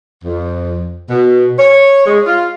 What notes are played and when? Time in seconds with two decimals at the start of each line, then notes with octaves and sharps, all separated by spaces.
0.24 F2
1.10 B2
1.59 C#5
2.06 G#3
2.26 F4